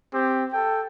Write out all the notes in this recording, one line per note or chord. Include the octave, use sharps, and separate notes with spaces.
C4 G4
A4 G5